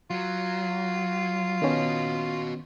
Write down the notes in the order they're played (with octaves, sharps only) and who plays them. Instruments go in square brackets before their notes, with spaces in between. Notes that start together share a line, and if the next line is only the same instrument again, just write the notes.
[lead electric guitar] F#3 [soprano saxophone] F4
[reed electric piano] D#3 B3 C#4 [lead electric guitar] F#4 D#5